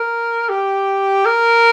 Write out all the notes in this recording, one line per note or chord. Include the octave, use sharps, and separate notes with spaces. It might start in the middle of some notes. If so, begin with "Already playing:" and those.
Already playing: A#4
G4
A#4